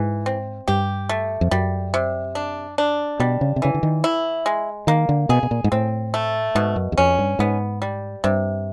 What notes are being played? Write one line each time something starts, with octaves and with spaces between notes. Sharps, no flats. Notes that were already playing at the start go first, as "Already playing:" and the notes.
Already playing: G#2 E3
C4
G2 G4
A3
F2
F#2 G3
C3
D4
D4
B2 G3
C#3
C3
C#3 E3
D3
D#3
E4
G#3
D#3 A#3
D3
B2 G#4
B2
A#2
G#2
A2 C4
A3
G#2 B2
F#2
E2
F2 C#4
G2
G#2 B3
G3
G2 C3